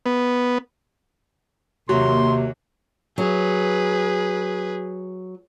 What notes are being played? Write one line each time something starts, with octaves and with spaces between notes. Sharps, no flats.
B3
D#2 C3 F#3 A#3 C6
F#3 G#4 B4